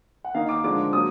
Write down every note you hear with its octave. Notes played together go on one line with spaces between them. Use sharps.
F#5
D#3 A#3 D#4 F5
D6
D3 F3 G#3 D4 D6
F#3 A#3 D#6